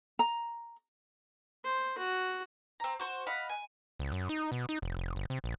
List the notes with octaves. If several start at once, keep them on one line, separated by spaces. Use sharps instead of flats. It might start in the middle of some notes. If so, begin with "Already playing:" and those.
A#5
C5
F#4
C4 A#5
F#4 C5
D#5 F5 F#5 B5
G#5
C#2
F#2
D#4
B2
D#4
F1
F1
G1
C3
A#1